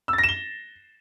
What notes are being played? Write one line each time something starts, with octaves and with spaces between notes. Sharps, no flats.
E6
A6
A#6
E7
G7